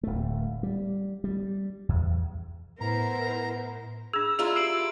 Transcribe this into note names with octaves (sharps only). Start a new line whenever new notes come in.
D1 A3
G3
G3
E2
A2 B3 E4 A#4 C5 A#5
D4 G#4 E6 G#6
E4 F4 G#4 A#4
G4 C7 D7 F#7